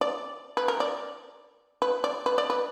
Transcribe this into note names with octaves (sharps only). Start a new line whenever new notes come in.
D5
B4
A#4
D5
B4
D5
B4
D5
B4